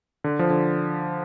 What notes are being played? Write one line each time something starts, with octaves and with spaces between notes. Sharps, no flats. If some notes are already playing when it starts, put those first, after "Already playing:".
D3
F3
D3